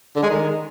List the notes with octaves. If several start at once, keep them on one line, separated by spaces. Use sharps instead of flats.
D3
G#3
D#3